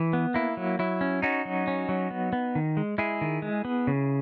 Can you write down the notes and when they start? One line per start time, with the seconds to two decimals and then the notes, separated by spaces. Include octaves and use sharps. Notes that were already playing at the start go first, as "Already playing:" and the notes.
Already playing: E3
0.13 B3
0.34 A#3 E4
0.57 F#3
0.79 F#3 E4
1.01 C#4
1.22 C#4 D#4 F#4
1.45 F#3
1.67 C#4
1.89 F#3
2.11 B3
2.33 B3
2.55 D#3
2.77 G#3
2.98 G#3 E4 G#4
3.21 D#3
3.42 G#3
3.65 B3
3.87 C#3